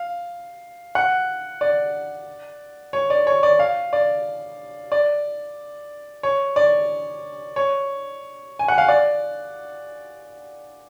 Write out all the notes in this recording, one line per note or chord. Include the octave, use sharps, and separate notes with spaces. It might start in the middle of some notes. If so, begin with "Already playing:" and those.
Already playing: F5
F#5
D5
C#5
D5
C#5
D5
F5
D5
D5
C#5
D5
C#5
G#5
F#5
F5
D5